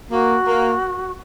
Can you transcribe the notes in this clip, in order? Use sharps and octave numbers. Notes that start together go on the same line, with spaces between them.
A#3 F#4
A#3